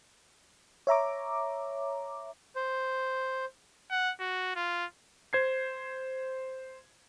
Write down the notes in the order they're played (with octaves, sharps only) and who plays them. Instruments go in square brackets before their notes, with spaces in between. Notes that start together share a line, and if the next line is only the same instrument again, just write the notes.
[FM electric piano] C#5 E5 A#5 D6
[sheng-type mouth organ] C5
[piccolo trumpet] F#5
F#4
F4
[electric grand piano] C5 G#6 C7